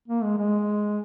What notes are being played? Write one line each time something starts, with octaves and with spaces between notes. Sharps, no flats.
A#3
G#3
G#3